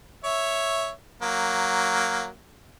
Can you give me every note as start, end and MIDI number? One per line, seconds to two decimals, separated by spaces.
0.24 0.90 73
0.24 0.90 76
1.22 2.28 54
1.22 2.28 58